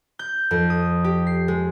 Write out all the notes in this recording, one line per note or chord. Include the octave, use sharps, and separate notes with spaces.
G6
F2
D#6
G4
C7
G#3